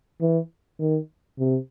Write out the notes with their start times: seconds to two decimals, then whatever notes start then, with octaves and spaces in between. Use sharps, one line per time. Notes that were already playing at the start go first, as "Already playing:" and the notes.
0.21 E3
0.79 D#3
1.39 C3